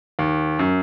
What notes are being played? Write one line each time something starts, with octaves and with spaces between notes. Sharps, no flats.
D#2
F#2